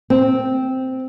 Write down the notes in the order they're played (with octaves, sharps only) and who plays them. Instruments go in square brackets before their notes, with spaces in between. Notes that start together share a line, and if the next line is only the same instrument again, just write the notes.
[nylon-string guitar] C4